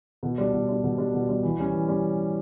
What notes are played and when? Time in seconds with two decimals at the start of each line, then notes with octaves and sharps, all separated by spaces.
0.23 B2
0.38 G3 D4
0.53 B2
0.69 G3 D4
0.84 B2
0.98 G3 D4
1.14 B2
1.29 G3 D4
1.43 E3
1.59 G3 C#4
1.74 E3
1.88 G3 C#4